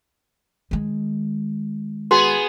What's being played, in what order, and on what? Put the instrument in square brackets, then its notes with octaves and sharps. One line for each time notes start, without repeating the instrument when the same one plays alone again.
[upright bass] D#3 G#3
[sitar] B3 G#4 [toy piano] F#4